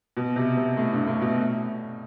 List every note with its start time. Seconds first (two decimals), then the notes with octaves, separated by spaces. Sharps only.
0.17 B2
0.36 C3
0.57 C3
0.77 A2
0.93 G2
1.07 A2
1.22 B2
1.37 A2